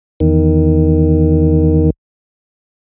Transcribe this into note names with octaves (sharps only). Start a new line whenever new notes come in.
E2 D#3